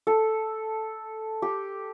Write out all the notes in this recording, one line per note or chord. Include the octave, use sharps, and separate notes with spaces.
A4
G4